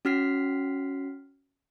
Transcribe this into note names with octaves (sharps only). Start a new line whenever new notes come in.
C#4 F#4 F6 B6 C7